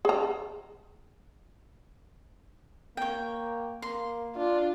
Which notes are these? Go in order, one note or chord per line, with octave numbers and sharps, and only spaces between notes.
G#4 A#5
A#3 C#5 G5
A#3 C6
D4 F4